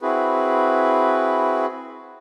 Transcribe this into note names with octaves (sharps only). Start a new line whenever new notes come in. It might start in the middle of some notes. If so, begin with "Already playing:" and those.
C4 E4 F#4 G#4 B4